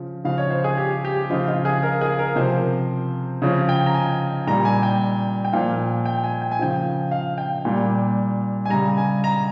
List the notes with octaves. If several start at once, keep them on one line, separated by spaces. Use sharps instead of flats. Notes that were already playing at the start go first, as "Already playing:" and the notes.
Already playing: C#3 F3
C#3 F3 F5
C#5
C5
G#4
G4
G4
C#3 F3 F4
F4
G#4
A#4
G#4
A#4
C3 F3 C5
C#3 F3 C#5
G5
A#5
G#5
A#2 G3 A#5
G#5
G5
G5
A#2 F3 F5
G5
G#5
G5
G#5
C#3 F3 G5
F5
G5
A#2 G3
G#5
C#3 G3 A#5
G#5
A#5